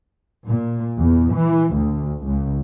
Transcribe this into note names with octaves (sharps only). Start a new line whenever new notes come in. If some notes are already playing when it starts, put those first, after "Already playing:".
A#2
E2
E3
D2
C#2